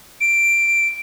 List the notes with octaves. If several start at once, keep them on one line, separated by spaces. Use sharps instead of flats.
D7